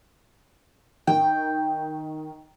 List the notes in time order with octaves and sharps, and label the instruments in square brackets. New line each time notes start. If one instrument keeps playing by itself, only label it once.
[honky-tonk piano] D#3 [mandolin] G5